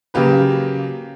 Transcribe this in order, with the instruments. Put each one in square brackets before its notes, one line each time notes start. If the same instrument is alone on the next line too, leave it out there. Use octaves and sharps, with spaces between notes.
[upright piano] C#3 F#3 A#3 G4 B4